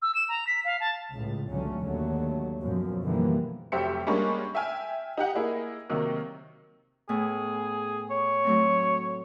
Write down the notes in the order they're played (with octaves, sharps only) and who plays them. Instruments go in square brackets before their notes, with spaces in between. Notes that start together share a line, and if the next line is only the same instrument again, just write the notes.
[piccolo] E6
E7
A#5
B6
F5
A5
[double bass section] C#2 A2
G#1 C#2 D3 F#3 A3 C#4
D#2 D3 F#3 A3
F#2 B2 F3 F#3
B2 D3 E3 F3 G3 A#3
[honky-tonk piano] F1 F#3 G4 C5 E5 C#7
G3 G#3 A#3 C#4 D4
E5 G5 G#5 F6
D#4 G4 F#5
A#3 E4 G#4 D#5
C3 D#3 F#3 A#3
[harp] A2 B3 G#5 [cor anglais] G#4
[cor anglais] C#5
[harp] F#3 A3 C4